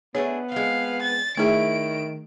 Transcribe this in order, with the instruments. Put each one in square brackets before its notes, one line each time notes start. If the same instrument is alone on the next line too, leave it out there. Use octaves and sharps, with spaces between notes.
[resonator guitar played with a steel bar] A3 D4 G#4 [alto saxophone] B3 [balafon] C#5
[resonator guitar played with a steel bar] G#3 C4 [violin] F5
[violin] A6
[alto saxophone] D#3 [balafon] A3 G#4 G5 [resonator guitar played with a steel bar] E4 C#5 [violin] D7